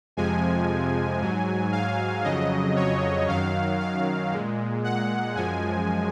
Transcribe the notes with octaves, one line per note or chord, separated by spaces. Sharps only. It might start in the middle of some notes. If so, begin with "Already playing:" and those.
F2 C3 F3 G#3 G#5
G#2 F#3
F5
F2 C#3 F#3 D#5
C#5
F#2 D#3 F#3 F5
F5
A#2 G#3
F#5
F#2 F3 G#3 G#5